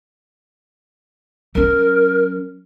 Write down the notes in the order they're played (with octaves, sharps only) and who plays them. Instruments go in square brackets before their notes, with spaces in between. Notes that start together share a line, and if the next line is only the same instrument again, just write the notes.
[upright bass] F#3 C#4 [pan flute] A#4